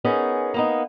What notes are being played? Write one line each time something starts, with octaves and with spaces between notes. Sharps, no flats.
B3 C#4 D#4 G#4 A#4
A#3 B3 D#4